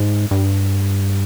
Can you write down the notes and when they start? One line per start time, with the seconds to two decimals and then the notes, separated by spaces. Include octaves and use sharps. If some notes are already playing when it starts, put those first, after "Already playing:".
Already playing: G#2
0.31 G2